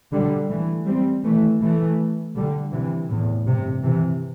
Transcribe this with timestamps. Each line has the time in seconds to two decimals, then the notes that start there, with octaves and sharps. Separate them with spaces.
0.12 D3 G3
0.49 E3 A3
0.86 G3 C4
1.23 E3 A3
1.60 E3 A3
2.35 D3 G3
2.72 C3 E3
3.09 E2 A2
3.47 G2 C3
3.83 C3 E3